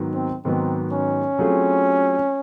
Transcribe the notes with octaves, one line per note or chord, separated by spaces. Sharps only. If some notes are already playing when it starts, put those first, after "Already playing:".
Already playing: G#2 D#3 F#3 B3
C4
G#2 D#3 F#3 B3 C4
C#4
F#3 A3 C4 F4 G#4